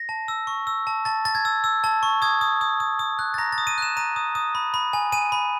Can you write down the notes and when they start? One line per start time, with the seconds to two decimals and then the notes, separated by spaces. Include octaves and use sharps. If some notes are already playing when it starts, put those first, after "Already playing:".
Already playing: A#6
0.09 A5
0.28 E6
0.47 C#6
0.67 E6
0.87 A5
1.05 A5 A6
1.25 A5 A6
1.35 G#6
1.45 E6
1.64 E6
1.84 A5
2.03 C#6
2.22 D#6 G#6
2.41 D#6
2.61 D#6
2.80 D#6
2.99 D#6
3.19 F#6
3.34 A6
3.38 A#5 A#6
3.52 A6
3.58 D#6
3.67 D#7
3.78 F#6 E7
3.97 A#5 D#7
4.16 D#6
4.35 D#6
4.55 B5
4.74 B5
4.93 G#5
5.12 G#5 D#7
5.32 B5